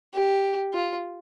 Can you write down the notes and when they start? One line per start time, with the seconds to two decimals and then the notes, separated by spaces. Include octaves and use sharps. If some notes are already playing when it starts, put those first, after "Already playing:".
0.14 G4
0.73 F4